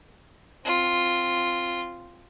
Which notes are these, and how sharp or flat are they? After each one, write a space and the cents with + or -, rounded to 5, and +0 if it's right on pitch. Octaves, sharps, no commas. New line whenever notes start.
C4 +0 F4 +0